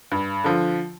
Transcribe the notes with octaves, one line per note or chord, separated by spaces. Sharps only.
G2
D3 F3